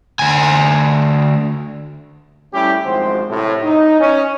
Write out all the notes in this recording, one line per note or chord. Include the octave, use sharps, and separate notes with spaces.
D2 G#5
G3 A3 C#4 E4 G4
G#1 F#2 F3 G#3 F#4 C5
A2 C3
D#4
C#4